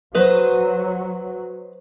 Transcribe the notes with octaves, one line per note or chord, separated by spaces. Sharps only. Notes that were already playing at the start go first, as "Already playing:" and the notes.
F#3 B4 C5 D#5